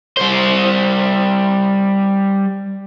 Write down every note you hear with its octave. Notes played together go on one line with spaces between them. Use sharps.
G3 C5